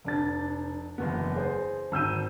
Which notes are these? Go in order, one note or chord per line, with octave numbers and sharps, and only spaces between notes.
F1 D4 A6
F#1 E2 B3
G#4 C5
G#1 E6 G6 D#7